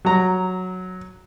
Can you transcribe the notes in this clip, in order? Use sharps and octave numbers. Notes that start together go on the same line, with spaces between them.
F#3 A#5